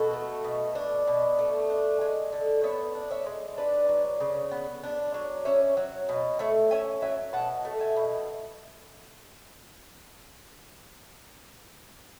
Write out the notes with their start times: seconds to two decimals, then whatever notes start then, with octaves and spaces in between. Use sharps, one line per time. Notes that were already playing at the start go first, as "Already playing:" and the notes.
Already playing: B2 F#4 A4
0.13 A3
0.44 B2
0.75 D4
1.07 B2
1.39 A3
1.70 D4
2.01 G#3
2.32 D3
2.64 B3 C#5 E5
2.95 D4
3.11 C#5 E5
3.26 G#3
3.58 D4 B4 D5
3.89 F#3
4.20 C#3
4.52 B3
4.83 D4
5.14 F#3
5.45 C#4 C#5 E5
5.77 F#3
6.09 B2
6.39 A3 C#5 E5
6.71 C#4 E5 G#5
7.02 F#3 E5 G#5
7.33 B2 F#5 A5
7.65 A3
7.81 E5 G#5
7.97 B2